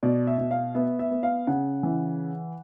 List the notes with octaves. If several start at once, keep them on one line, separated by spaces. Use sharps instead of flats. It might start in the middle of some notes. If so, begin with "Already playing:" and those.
B2 D5
E5
B2
F5
B3 E5
E5
B3
F5
C#3 F#5
E3